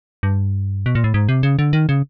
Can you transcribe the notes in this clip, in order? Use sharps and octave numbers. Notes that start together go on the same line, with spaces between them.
G2
B2
A#2
A2
G#2
C3
C#3
D3
D#3
C#3